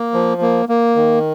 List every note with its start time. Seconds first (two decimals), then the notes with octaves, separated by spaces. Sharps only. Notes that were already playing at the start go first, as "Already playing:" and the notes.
Already playing: A#3
0.14 F3
0.41 A#3
0.69 A#3
0.96 D#3